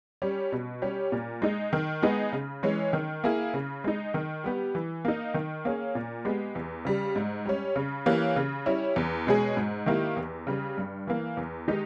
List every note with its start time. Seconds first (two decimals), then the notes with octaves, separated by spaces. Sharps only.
0.22 G3 C#4 G4
0.52 B2
0.82 G3 C#4 G4
1.12 A#2
1.42 G#3 D#4
1.73 D#3
2.02 G#3 B3 D#4 G#4
2.33 C#3
2.63 E3 G#3 C#4
2.93 D#3
3.24 A#3 E4 G#4
3.54 C#3
3.84 G#3 D#4
4.14 D#3
4.44 G3 B3 G4
4.75 E3
5.05 A#3 D#4
5.34 D#3
5.65 A#3 C#4 G#4
5.95 A#2
6.25 G#3 B3 G4
6.55 E2
6.85 C#3 G3
7.16 G#2
7.46 G3 C#4
7.76 C#3
8.06 E3 A#3 C#4 G4
8.36 C#3
8.66 G3 C#4 E4
8.96 E2
9.27 B2 G#3 C#4 G#4
9.57 G#2
9.86 D#3 A#3 E4 G4
10.17 E2
10.47 C#3 G3
10.78 G2
11.07 E3 A#3
11.37 E2
11.68 D#3 G#3 D#4 G4